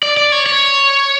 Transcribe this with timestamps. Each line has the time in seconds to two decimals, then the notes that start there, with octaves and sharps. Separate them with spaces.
0.03 D5
0.17 D5
0.32 C#5
0.46 C#5